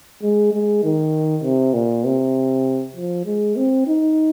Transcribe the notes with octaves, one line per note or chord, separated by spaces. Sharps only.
G#3
G#3
D#3
C3
A#2
C3
F3
G#3
C4
D#4